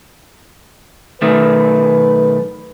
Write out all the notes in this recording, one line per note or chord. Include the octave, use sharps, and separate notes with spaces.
B1 D#3 A3 B4